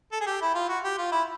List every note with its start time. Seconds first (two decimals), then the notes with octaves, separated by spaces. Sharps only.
0.12 A4
0.21 G#4
0.26 G4
0.41 E4
0.55 F4
0.69 F#4
0.84 G4
0.98 F4
1.12 E4